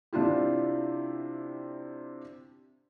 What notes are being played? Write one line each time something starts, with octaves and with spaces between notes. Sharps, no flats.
C3 D4 E4 F4 G4